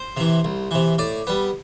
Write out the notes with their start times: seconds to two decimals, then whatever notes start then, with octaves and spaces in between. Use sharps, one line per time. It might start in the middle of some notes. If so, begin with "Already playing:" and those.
Already playing: C5
0.17 C3 E3
0.44 C2
0.71 C3 E3
0.98 A2 D5
1.27 G3 B3